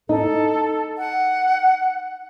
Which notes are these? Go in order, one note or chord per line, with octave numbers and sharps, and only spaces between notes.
D#4 A4
F#5